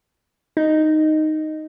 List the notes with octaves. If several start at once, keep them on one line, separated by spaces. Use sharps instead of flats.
D#4